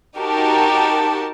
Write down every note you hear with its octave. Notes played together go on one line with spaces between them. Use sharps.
D#4 F#4 G4 A#4 A5